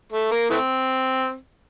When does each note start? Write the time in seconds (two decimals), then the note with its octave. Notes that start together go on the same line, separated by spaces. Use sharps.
0.12 A3
0.31 A#3
0.50 E3 A3 C4